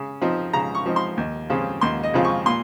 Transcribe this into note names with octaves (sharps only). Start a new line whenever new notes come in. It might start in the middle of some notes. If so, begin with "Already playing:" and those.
Already playing: C#3
F3 C4 D#4
C#3 A#5
C#6
F3 C4 D#4
C6
D#2
C#3 F3 C4 F4
D#2 C6
D#5
C#3 F3 C4 F4
C#6
A#2 C6